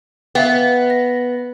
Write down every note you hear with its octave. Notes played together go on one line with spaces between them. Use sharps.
B3 E5 F5 G5
A#6